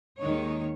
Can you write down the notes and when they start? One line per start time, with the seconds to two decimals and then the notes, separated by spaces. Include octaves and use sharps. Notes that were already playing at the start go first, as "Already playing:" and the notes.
0.20 D#2 D#3 G#3 D#4 C#5